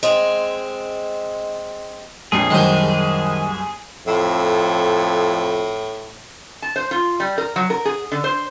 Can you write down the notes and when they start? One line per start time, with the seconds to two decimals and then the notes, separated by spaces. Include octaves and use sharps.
0.03 G#3 C4
2.32 A#1 F2 G#4 C7
2.51 F#1 C2 D#3 C5
4.07 F2 A2
6.62 A5
6.76 C5
6.91 F4
7.20 G3
7.38 A#4
7.56 F#3
7.70 A#4
7.85 G#4
8.12 D3
8.24 C5